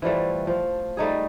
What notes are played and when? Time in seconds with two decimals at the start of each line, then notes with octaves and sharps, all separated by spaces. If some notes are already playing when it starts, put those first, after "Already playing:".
0.02 E3 F3 G3 A3
0.47 F3
0.97 G3 A3 D#4 G#4